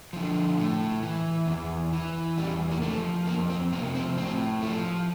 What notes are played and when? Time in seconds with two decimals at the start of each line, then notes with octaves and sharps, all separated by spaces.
0.13 D3 F3
0.58 A2
1.03 E3
1.47 E2
1.93 E3
2.38 E2 G3
2.71 A#3
2.82 D3 A3
2.86 F3
3.27 F2 A#3
3.50 C4
3.73 C3 F3 A#3
3.95 C4
4.17 A2 C4
4.62 F3 A3